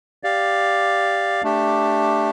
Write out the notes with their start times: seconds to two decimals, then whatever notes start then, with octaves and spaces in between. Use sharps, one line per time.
0.23 G4 D5 F5
1.43 A3 D4 G4